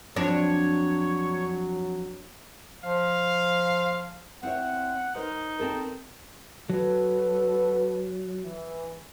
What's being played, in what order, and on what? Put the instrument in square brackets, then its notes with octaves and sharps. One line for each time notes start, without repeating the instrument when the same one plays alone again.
[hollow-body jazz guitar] F2 [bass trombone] F#3 [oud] D4 [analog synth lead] C#5
[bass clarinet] F3 [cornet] F5
[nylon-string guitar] C4 E4 C#5 [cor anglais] F#5
[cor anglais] D#4 [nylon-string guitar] A#4 C5
[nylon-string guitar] C4 A4 A#4
[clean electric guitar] F#3 [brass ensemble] F#4 A4 B4
[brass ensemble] E3